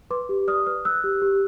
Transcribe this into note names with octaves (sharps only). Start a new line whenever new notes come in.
B4 C6 D6
G4
D5 D#6 F6
B4 D#6 F6
B4 E6 F#6
G4
G4